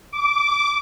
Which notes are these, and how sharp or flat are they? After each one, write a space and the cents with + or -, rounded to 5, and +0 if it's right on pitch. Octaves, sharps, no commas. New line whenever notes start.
D6 -15